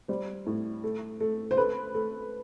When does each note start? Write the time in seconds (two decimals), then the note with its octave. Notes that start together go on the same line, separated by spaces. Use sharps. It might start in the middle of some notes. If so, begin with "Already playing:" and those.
0.08 G3 C5
0.46 A2
0.84 A3
1.20 A3
1.51 C5
1.57 A3 B4
1.95 A3